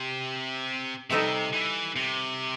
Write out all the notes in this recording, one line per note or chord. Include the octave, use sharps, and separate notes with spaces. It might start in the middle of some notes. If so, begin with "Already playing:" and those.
Already playing: C3
C3 G3 D#4 A4 C5 E5
E3
C3